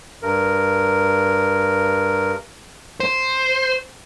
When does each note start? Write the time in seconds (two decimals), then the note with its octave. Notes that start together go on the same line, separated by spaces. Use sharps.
0.22 G2 A#4
3.00 C5